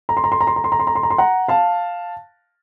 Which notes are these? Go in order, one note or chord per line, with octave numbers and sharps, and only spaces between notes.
A#5
C6
A#5
C6
A#5
C6
A#5
C6
A#5
C6
A#5
C6
A#5
C6
F#5 A#5
F5 A5